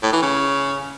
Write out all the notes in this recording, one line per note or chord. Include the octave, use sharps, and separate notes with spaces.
A2
E3
C#3